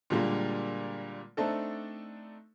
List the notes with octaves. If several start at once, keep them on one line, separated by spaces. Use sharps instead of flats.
A#2 D3 G3 G#3 A#3
A3 C4 D4 D#4 A4